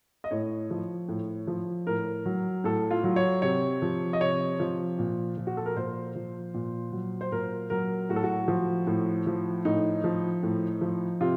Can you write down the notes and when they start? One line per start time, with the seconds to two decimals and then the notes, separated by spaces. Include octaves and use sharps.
0.24 D#5
0.31 A2 C#5
0.70 F3
1.09 A2
1.47 F3
1.87 A2 A#4
2.26 F#3
2.64 A2 A4
2.91 F4
3.04 F#3
3.16 C#5
3.42 C3 C#5
3.82 F3
4.13 D#5
4.21 C3 C#5
4.60 F3
4.99 A#2
5.37 F3
5.47 F#4
5.57 A4
5.66 A#4
5.76 A#2 C5
6.15 F3
6.54 A#2
6.92 F#3
7.21 C5
7.32 A#2 A#4
7.70 F#3 A#4
8.09 A2 F#4
8.16 A4
8.24 F#4
8.48 F3
8.87 A2
9.27 F3
9.65 A2 D#4
10.04 F3
10.43 A2
10.81 F3
11.21 C3 F4